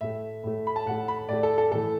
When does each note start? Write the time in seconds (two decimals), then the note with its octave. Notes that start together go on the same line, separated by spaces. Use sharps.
0.01 A2 A3 E5
0.44 A2 A3
0.67 B5
0.76 A5
0.86 A2 F#5
0.91 A3
1.08 B5
1.29 A2 A3 D5
1.43 A4
1.58 A4
1.72 A2 E3 A3 A4